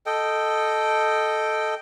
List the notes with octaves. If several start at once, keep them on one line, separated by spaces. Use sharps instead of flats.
A4 D#5 G5